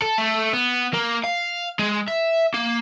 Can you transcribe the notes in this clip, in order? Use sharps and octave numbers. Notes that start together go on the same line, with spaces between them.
A4
A3
B3
A#3
F5
G#3
E5
A#3